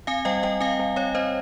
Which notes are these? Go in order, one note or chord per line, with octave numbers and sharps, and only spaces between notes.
C4 F5 G#5
G3 D#5 G5
G3 D#5 G5
C4 F5 G#5
G3
C4 C#5 F5
C4 C5 D#5